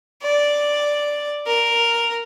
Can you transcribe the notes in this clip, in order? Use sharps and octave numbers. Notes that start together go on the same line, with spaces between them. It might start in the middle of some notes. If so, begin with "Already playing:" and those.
D5
A#4